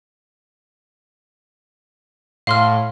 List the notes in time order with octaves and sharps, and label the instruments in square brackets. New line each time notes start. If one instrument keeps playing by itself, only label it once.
[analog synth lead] A2 [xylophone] F5 C6 F6